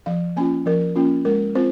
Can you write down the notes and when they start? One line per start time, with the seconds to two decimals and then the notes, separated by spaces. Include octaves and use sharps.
0.06 F3 F5
0.36 A#3 C#4 F4 G#5
0.66 F3 A#4
0.96 A#3 C#4 F4
1.25 G#3 A#4
1.55 C4 F4 C5